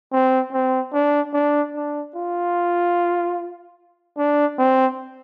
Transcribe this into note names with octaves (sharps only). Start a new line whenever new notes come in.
C4
C4
D4
D4
D4
F4
D4
C4